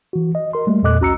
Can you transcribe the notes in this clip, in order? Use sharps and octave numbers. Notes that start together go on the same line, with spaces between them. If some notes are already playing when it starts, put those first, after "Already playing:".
E3 F#4
D#5
A#4 C6
G3 A3 A#3
E2 A#2 A4 D#5 D6 F#6
B1 C#4 F#4 A#5 E6 C#7